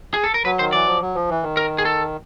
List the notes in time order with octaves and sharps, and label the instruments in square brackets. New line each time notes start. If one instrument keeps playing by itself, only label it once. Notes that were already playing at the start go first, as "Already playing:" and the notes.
[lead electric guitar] G#4
A4
A#4
[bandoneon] F#3 [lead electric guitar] B4
[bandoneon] D#3 [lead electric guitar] C5
[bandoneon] E3 [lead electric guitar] D5
[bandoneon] F3
F#3
F3
E3
D#3
[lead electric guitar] A#4
G#4
A4